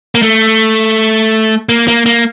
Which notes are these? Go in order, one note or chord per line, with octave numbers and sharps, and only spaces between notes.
A#3
A3
A#3
A#3
A#3